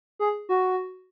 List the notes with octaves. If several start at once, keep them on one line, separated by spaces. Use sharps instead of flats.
G#4
F#4